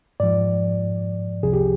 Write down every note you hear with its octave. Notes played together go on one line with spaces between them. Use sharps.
G#2 F3 D5
C2 C3 F3 G#4
G4